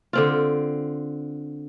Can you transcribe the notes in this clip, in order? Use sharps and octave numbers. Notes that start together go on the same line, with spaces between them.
D3 C4 F4